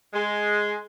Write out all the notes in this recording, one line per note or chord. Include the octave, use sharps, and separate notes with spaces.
G#3